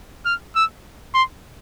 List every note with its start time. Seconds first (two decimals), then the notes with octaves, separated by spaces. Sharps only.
0.26 F6
0.55 E6
1.14 C6